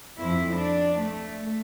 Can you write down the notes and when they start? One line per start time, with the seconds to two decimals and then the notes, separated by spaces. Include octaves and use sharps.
0.19 F2 E4
0.54 D4
0.98 A3